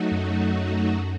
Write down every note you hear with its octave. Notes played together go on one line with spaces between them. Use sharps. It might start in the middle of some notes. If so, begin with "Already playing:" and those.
Already playing: F#3 A3 D#4 F#4
F#2